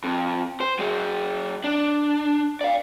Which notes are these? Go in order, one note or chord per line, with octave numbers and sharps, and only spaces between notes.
F2
C5
F#3 G#4
D4
D5 F5